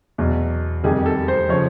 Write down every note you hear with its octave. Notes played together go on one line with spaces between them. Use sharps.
E2 B2 F#3
F2 C3 D#3 G3 G#4
A4
C5
C#3 F3 C#5